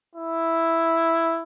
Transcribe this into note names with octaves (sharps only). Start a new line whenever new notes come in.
E4